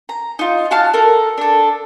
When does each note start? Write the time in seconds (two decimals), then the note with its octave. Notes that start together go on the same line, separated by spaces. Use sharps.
0.09 A#5
0.39 D#4 F4
0.71 F#4 F5 A5 F6
0.93 A4 A#4
1.38 D4 A4